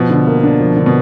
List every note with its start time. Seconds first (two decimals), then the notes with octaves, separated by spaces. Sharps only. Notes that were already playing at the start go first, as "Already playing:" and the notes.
Already playing: B2 F3
0.10 D3
0.27 A#3
0.44 D4
0.61 F3
0.77 D3
0.86 B2